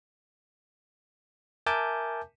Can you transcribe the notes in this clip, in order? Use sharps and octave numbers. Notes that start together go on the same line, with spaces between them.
A#4 E5 G#5 A5 D6 G6